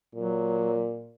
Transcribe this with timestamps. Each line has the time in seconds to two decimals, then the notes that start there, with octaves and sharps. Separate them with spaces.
0.15 A#2 F#3